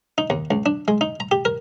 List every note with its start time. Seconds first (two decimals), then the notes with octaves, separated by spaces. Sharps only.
0.18 D#4
0.30 D#2
0.51 C#2
0.66 D4
0.88 G#3
1.01 D#4
1.20 A#5
1.31 G4
1.45 A#4